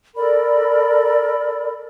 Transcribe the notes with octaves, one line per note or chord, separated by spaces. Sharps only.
A4 A#4 D5 B5